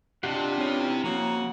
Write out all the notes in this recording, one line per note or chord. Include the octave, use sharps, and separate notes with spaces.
C3 D4 F4 G4 D#5 F#5 A5
E2 G#3 C4 C#4 E4
C#3 F3 A#3 F#4 A#5